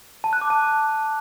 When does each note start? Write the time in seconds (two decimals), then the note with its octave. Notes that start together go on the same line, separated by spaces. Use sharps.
0.24 A5
0.33 F#6
0.41 D6
0.50 A5